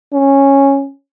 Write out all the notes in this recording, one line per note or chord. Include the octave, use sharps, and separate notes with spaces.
C#4